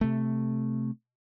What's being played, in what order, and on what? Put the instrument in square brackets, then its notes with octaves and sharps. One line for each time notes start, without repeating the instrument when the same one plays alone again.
[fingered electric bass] C3 A3